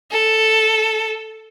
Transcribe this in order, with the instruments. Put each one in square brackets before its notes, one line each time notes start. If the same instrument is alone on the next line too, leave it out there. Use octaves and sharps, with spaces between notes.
[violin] A4